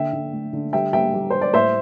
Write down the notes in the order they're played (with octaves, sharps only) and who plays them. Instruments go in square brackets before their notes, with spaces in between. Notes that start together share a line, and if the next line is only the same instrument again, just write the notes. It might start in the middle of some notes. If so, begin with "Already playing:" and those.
Already playing: [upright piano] D3 E5 G5
D3
A3
D3
G3 E5 G5
G3 E5 G5
G3
G3 C5
D5
A2 C5 E5